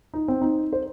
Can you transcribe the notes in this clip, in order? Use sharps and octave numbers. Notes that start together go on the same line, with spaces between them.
D#4
C4
D#4
C5